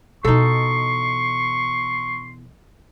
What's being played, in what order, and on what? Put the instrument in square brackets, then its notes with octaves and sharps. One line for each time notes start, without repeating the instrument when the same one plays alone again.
[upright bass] B2 E3 [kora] D#4 A4 [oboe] C6 [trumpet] C#6